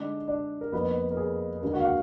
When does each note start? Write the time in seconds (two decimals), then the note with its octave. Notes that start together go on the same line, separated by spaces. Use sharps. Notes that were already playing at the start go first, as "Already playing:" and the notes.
Already playing: D3 G#3 D4 D#4 D5
0.28 D4 D5
0.61 A#4
0.72 F2 F3 A#3 B3 D#4 B4
1.11 A#4
1.17 G#4
1.62 D#2 D3 G#3 A#3 D4 A#4
1.73 F#4 F#5
1.80 F5
1.85 F#4 F#5